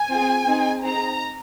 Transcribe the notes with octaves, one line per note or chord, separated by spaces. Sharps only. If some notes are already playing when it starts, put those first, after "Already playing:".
Already playing: G#5
C4 F4 G#4
C4 D#4 G#4
C4 D#4 G#4 A#5